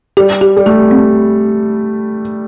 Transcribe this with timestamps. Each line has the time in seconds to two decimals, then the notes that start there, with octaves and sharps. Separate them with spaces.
0.17 G3 G4
0.41 G4
0.57 G3
0.66 A3 G4
0.91 C4